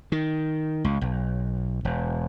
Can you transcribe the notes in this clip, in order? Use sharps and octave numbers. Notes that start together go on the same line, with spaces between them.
D#3
C#2
B1
E1